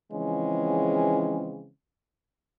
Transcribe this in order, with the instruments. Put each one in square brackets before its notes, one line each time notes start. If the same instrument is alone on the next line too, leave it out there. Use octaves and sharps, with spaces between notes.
[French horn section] C#3 E3 F3 G#3 C4 C#4